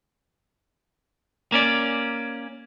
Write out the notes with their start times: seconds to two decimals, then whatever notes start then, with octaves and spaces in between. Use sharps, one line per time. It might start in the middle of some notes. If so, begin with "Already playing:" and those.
1.52 A#3 C#4 D5